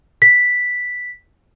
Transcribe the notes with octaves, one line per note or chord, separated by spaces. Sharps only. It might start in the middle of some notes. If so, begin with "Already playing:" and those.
B6